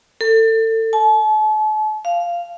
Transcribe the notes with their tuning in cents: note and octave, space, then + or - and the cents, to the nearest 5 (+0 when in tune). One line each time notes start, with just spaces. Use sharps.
A4 +30
A5 -40
F5 -10